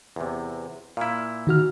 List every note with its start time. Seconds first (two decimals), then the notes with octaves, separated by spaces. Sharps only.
0.16 E2 C3
0.97 A#2 E4 F5
1.47 D#3 F#4 F6